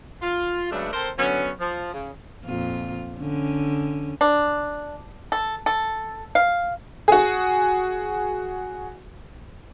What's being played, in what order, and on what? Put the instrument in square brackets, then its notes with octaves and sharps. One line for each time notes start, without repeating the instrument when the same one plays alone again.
[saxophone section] F4
C#3 F#3 G#3 A3 B3 D4
C4 A4 A#4 C5
D3 F#3 B3 C#4
F3
C#3
[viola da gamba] F2 A#2 F4
D3 C#4
[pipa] D4
A4
A4
F5
[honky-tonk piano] F#4 G#4